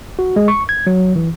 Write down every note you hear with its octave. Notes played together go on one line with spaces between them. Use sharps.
F#4
G#3
C#6
G#6
F#3
E3